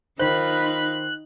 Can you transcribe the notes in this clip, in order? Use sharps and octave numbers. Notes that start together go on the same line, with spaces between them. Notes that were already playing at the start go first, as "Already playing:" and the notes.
D#3 D#4 F4 C5 B5 F#6